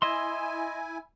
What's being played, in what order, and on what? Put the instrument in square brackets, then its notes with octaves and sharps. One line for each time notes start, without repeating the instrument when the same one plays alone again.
[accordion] E4 G#5 [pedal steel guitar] D#5 E5 C6